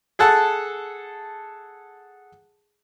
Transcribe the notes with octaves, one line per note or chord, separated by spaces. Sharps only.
G#4 A4 F#5 A5